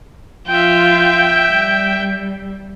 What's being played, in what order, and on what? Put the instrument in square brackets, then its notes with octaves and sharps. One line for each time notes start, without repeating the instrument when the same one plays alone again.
[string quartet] F3 F4 F5 [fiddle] E5 G5 [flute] G6
[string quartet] G3